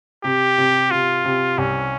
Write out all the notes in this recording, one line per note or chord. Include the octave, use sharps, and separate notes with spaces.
C3 G4
C3
C3 F4
C3
C2 C#4